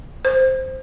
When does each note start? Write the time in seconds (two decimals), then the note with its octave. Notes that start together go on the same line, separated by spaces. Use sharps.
0.25 C5